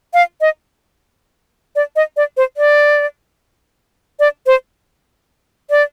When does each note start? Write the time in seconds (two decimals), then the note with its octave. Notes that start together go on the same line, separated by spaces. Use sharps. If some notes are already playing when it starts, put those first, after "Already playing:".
0.14 F5
0.41 D#5
1.76 D5
1.96 D#5
2.17 D5
2.37 C5
2.57 D5
4.20 D5
4.46 C5
5.70 D5